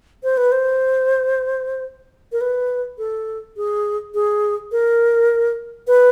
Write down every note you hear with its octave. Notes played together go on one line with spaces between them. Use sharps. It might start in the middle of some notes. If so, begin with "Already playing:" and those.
C5
B4
C5
A#4
B4
A4
G#4
G#4
A#4
B4